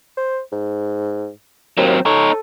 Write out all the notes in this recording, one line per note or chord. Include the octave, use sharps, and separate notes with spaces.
C5
G#2
D#2 F#3 C4
D#4 A4 C#5